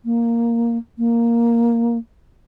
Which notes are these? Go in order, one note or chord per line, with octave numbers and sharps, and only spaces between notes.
A#3
A#3